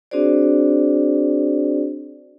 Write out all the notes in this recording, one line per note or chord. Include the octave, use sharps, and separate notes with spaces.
C4 D4 F#4 G#4 C5 D5